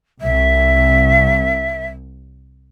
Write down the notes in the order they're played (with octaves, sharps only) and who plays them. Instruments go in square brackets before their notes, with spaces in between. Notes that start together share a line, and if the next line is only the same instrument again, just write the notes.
[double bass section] C2 [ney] E5